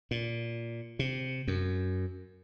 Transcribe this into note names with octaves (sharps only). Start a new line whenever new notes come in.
A#2
C3
F#2